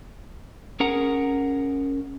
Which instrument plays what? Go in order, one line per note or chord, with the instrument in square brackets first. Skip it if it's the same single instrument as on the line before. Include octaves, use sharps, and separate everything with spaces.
[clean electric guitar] C#4 G#4 A#4 F#5 A#5